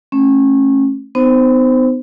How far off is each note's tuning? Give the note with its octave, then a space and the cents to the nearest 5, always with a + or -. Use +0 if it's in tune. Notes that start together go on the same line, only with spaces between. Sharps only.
A3 +0 C#4 -25
B3 +35 D#4 -20 C5 -5